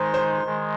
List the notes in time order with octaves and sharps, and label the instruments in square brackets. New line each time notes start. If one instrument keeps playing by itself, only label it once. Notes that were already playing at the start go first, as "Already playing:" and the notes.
Already playing: [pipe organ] D#3 G#3 D#4 [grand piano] C5
[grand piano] C5
[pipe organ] D#3 G#3